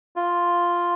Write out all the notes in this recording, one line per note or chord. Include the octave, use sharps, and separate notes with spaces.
F4